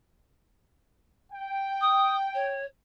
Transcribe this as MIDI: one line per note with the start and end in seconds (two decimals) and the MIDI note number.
1.32 2.59 79
1.81 2.14 87
2.34 2.65 73